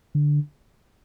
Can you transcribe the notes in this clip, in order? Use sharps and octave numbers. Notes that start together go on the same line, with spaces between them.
D3